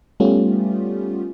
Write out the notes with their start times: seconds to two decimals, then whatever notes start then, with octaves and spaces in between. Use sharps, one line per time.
0.20 G3 A3 B3 C#4 F4 G4